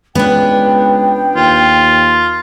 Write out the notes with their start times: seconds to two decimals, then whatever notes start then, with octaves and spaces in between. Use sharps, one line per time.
0.15 C#2 B3 D4 G5
1.35 D#2 F4